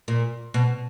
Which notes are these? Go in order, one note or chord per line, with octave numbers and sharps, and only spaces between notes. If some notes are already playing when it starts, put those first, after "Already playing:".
A#2
B2